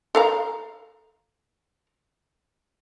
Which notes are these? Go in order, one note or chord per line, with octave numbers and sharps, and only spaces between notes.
A4 F5 A#5